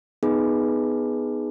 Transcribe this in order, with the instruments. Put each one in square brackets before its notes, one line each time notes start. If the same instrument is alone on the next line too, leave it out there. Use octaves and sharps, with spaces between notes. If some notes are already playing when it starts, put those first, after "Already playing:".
[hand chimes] B3 D#4 G#4 B4